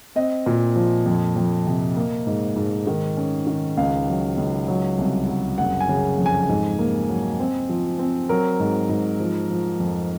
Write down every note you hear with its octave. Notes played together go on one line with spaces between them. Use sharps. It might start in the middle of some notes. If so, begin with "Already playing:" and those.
C4 D#5
A#2
F3
F2
F2
C3
A#3
G#2
G#2
D#3
C#4
D#3
C#2 F5
F#3
C#2
F#3
C2
F#3
F#1 F#5
G#5
C#3
F2
G#5
G#2
A#3
F#3
C4
F3
C4
F#3 A#4
G#2
G#2
F3
F3
F2